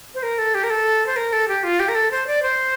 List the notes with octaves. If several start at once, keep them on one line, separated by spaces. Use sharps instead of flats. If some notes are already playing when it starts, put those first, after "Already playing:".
C5
A#4
A4
G4
A#4
A4
C5
A#4
A4
G4
F4
G4
A#4
A4
C5
D5
C5